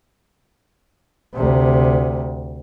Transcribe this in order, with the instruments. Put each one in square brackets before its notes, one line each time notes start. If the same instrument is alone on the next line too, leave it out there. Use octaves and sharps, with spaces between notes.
[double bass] D2 C3